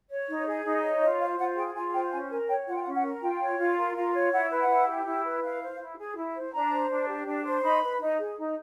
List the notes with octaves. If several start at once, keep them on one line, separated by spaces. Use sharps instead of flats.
C#5
D#4
G#4
D#4
C#5
F4 D#5
C5 F5
F4 F#5
G#4 G5
F4 G#5
C5 G5
C#4 G#5
A#4 G#5
C#5 G5
F4 F#5
G5
F#5
C#4
F#5
A#4
F4 G5
C#5
F4
A#4
F4
C#5
E4 F#5
B4
F#5
E4
G4
E4
B4
E4 F5
C5
E4
G#4
E4
C5
D4 A#5
C5
D4
G4
D4
C5
D#4 B5
B4
D#4
G#4
D#4